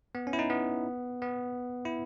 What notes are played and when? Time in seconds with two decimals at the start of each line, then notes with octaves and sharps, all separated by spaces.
0.15 B3
0.27 C#4
0.33 E4
0.39 D#4
0.50 B3
1.22 B3
1.85 E4